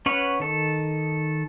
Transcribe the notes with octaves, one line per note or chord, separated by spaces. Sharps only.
C#4 B4 C#5 F#5
D#3 A4